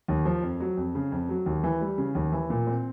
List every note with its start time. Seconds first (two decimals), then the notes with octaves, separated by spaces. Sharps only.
0.08 D#2
0.25 F3
0.43 F2
0.60 F#3
0.77 F2
0.95 C#3
1.12 F2
1.29 F#3
1.46 D#2
1.64 E3
1.81 G3
1.98 C#3
2.15 D#2
2.32 E3
2.50 A#2
2.67 C4